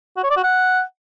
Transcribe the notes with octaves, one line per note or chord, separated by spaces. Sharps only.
F#4
C#5
D5
F#4
F#5